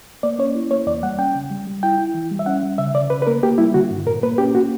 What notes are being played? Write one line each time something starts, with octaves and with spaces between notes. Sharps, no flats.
A#3 D5
C#4 C#5
E4
A#3 C#5
E2 D5
G3 F#5
C#4 G5
C#3
G3
G3
E4 G5
E4
E3
G3
E5
C#4 F#5
G3
C#3 E5
C#3 D5
C#3 B4
B4
A#3 A#4
A#3 G4
G3 E4
D3 F#4
G2
A#2 A#4
A#3 B4
C#4 G4
A#3 F#4